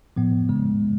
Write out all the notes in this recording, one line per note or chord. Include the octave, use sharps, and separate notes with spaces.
A2 F3 B3
C#3 G#3